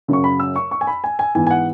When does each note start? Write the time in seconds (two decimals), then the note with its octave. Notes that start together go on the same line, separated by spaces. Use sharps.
0.08 F#2 C#3 F#3 C#6
0.24 B5
0.40 E6
0.56 C#6
0.71 C#6
0.81 G#5
0.87 B5
1.04 G#5
1.19 G#5
1.35 G#2 E3 B3 G#5
1.47 G#5
1.50 F#5